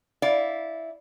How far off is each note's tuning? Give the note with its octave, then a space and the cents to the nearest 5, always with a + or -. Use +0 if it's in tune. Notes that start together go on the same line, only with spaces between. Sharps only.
E4 -10 D5 -10 F5 +10